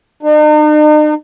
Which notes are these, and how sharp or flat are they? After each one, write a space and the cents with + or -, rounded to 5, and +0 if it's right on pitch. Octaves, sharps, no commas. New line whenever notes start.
D#4 -45